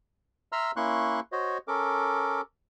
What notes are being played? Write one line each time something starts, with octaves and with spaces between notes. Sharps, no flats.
E5 A#5 C6 E6 F6
A#3 C#4 E4 C6 C#6 F#6
F#4 C5 C#5 D#5
C#4 A4 A#4 D6